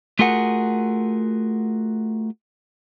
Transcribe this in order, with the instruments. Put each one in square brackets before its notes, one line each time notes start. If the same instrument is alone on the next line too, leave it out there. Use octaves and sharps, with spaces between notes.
[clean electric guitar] A3 F4 F#4 G#4 A#4 F#5